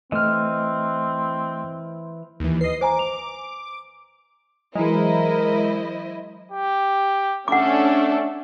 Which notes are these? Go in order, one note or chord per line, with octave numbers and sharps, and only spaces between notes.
E3 A3 C4 D#5 F6
D#2 E3
B4 D#5 C7
C5 G#5 A#5 D6
F7
E3 F#3 G#3 E4 A#4 C5 D#5
G4
A3 C#4 D4 A4 F#5 D6